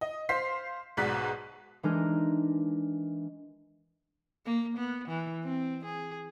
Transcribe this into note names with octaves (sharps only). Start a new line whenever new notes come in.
D#5
C5 F5 C6 B6 C7
B1 G#2 B2 D5 F#6 B6
E3 G#3 D4 D#4 A#4
A#3
B3
E3
C4
G#4